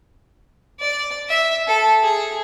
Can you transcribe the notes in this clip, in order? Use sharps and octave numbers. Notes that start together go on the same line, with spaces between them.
D5
E5
A4
G#4